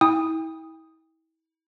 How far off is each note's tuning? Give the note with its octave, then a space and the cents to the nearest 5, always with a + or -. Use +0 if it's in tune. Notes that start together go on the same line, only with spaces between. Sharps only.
E4 -35 G5 +35 D#6 +0